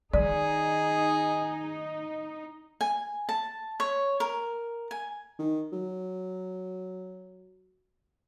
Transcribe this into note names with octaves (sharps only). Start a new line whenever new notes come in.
D#3 D#4 G#4 D5
G#5
A5
C#5
A#4
G#5
D#3
F#3